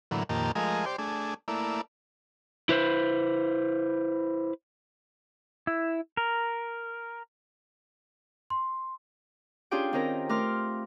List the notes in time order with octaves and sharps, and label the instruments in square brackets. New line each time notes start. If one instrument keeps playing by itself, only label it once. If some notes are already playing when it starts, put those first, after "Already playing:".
[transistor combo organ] A2 D3 E3 F#3 A#3
F2 A#2 D#3 A#3 G4 A5
F3 G#3 A3 G#4 A#4 D#5
G4 C5 D5
A3 D4 G#4
A3 A#3 E4 D5
[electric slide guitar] E4 B4 C5
[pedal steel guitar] E4
A#4
[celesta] C6
[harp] C#4 D4 F4 G4 G#4 G5
D#3 C4 C#4 A#4 A#5
A3 A#4 C6 D6 F6